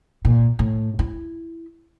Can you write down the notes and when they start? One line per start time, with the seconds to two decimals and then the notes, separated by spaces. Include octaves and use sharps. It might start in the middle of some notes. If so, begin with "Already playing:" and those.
0.25 A#2
0.59 A2
0.99 E4